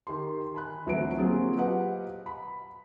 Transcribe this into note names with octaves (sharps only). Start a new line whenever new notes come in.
D#3 G4 C6
G#5 B5 F#6
D2 E3 F#3 A3 C4 D7
F#3 A#3 C4 F4 G4 G#4
G4 B4 D#5 F5 F#5
B5